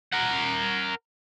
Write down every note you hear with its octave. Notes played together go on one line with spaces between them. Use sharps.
A#4 F#5